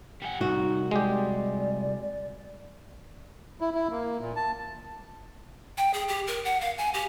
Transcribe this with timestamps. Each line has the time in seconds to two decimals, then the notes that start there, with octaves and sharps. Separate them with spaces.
0.22 G3 F#5 G#5
0.41 C2 D#4 F#4
0.91 G#3 G4 D5
2.02 D5
3.61 E4
3.74 E4
3.91 A#3
4.21 A#2
4.36 A5
5.78 G5
5.94 G#4
6.08 G4
6.27 A#4
6.45 F#5
6.61 F5
6.78 G#5
6.94 G4